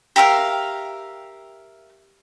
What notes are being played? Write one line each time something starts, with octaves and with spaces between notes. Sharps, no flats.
G4 A#4 E5 F5